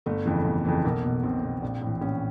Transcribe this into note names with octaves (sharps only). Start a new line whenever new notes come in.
G1 A3
F2 C#3 E3
G1
F2 C#3 E3
B1 A#3
B2
B1 C4
B2
A#1
A2
E3
A#1 C#4